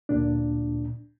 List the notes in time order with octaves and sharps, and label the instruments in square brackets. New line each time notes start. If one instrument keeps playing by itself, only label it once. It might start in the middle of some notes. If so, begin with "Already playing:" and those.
[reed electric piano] D2 A#2 D4